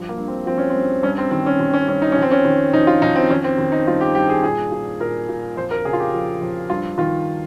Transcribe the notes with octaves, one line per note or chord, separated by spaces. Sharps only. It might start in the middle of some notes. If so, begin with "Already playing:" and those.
Already playing: G2 F3
A#3
G2
C4
F3 C4
C#4
G2 C4
G2 C#4
C4
D#3 C4
C#4
D#3
C#4
G2 C#4
D#4
F2 C#4
C4
C#4
D#3
F2 D#4
F4
F2 D#4
C4
D#3 C#4
C4
D#3
D#4
G2 F4
G4
G2 G4
G#4
A#2 G#4
A#2
A#2 A#4
A#2
F2 C5
A#4
C#3 G#4
F4
G4
F3
F2
G2 F4
D#3 F4